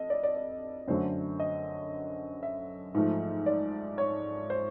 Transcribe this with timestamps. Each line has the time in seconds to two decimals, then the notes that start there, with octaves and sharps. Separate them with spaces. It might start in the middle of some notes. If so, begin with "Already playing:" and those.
Already playing: F2 D#5
0.10 D5
0.23 D5
0.36 D5
0.87 F#2 D3 F#3 A3 C5
1.40 D#5
2.43 E5
2.95 G#2 F3 A3
3.46 D5
3.98 C#5
4.50 C5